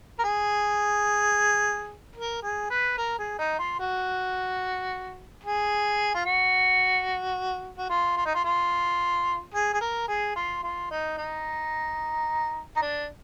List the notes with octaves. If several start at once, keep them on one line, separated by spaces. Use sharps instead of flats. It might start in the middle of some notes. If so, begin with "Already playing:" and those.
A#4
G#4
A#4
G#4
B4
A#4
G#4
D#4
F4
F#4
G#4
F4
F#4
F#4
F4
F4
D#4
F4
F4
G#4
G#4
A#4
G#4
F4
F4
D#4
D#4
D#4
D4